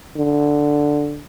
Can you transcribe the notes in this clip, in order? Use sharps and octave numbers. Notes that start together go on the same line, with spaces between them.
D3